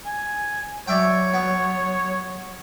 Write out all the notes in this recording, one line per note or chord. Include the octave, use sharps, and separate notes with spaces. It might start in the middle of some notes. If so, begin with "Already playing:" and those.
G#5
F#3 C#5 D5 E5 G5
B3